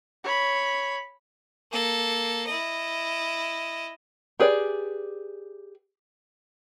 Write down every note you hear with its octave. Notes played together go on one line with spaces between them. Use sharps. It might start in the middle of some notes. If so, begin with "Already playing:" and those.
C#5 B5
A#3 A4
E4 D#5
G4 G#4 B4 D5